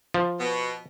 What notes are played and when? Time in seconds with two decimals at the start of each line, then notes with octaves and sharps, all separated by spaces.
0.14 F3
0.40 B2